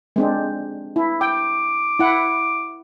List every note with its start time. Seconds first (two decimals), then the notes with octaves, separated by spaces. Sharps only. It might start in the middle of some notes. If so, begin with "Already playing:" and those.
0.16 G#3 C4 D4
0.96 E4
1.21 G5 D6
1.99 E4 F#5